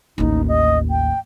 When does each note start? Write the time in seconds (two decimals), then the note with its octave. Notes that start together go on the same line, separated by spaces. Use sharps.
0.18 A1 D#2 D#4
0.48 D#5
0.90 G5